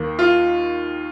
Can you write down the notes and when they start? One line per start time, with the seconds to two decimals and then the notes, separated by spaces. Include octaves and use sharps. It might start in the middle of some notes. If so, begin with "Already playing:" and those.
Already playing: D#2 D#3 A#3
0.19 F4